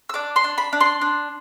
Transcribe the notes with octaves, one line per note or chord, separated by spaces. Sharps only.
E6
D4 D6
C6
D4
B5
D4
C6
D4